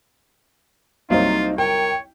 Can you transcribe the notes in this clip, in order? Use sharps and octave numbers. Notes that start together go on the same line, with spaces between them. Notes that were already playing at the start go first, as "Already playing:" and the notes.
C2 F#3 A#3 C4 D#4 F4 D#5
A#4 C#5 G5